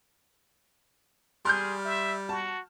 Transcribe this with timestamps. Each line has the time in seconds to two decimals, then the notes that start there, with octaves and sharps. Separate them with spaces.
1.45 G3 G#4 C6 F6 G6
1.85 E5
2.29 F#4 A5